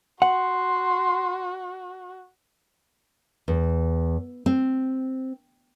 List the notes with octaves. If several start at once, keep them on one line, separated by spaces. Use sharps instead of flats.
F#4 F#5 C6
E2
C4